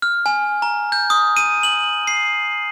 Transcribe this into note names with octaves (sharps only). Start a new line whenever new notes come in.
F6
G#5
A#5
G6
D#6
D#7
F#7
C7